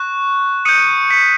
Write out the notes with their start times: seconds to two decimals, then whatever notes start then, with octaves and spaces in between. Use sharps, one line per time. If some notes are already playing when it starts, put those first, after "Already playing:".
Already playing: C#6 F#6
0.65 D#6 G6 C#7 D#7
1.10 B6 C#7